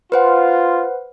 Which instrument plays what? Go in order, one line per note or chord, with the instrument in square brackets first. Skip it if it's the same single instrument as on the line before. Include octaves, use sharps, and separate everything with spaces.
[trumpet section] F4 [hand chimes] B4 C5 F#5